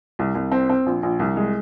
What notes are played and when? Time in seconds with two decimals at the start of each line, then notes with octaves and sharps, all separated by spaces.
0.19 C2
0.35 C2
0.52 C4
0.70 C4
0.86 A#1
1.03 A#1
1.19 C2
1.37 G#3